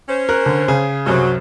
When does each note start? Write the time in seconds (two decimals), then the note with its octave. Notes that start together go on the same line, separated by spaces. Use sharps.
0.09 C#4 C5
0.29 A#4 F#6
0.46 D3
0.68 C#3 G#4
1.07 C2 F#2 F#3 C5